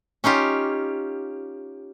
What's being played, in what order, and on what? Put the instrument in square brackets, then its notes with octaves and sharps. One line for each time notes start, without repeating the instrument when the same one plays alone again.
[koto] C#4 D#4 F4 G4